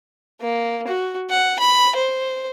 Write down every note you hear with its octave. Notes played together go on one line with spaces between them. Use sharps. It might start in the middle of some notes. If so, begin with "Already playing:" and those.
A#3
F#4
F#5
B5
C5